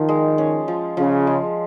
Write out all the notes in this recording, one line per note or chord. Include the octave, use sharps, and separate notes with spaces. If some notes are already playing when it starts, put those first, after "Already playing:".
Already playing: D#3 F3
G#3
C#4
F3
C#3 F3
G#3